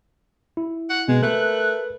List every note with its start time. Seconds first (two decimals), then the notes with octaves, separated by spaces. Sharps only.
0.57 E4
0.90 F#5
1.08 B2 G#3
1.23 A3 A#4 B4 F#6